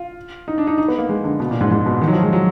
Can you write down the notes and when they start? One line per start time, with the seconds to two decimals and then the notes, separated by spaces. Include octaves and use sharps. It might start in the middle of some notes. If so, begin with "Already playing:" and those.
Already playing: F4
0.48 D#4
0.58 D4
0.67 D#4
0.78 D#4
0.88 B3
0.98 A#3
1.09 G#3
1.24 D3
1.40 B2
1.51 A#2
1.61 G#2
1.71 G#2
1.86 B2
2.01 D#3
2.08 F#3
2.13 F3
2.23 G#3
2.33 F#3